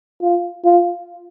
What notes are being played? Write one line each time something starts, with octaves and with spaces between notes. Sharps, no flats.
F4
F4